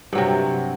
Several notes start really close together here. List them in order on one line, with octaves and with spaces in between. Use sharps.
G2 F#3 C3